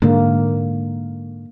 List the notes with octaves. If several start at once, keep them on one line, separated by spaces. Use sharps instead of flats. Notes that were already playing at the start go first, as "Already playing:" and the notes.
G#2 D3 A#3